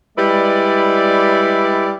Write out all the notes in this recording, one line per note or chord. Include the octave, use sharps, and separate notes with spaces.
G3 G#3 E4 B4 D5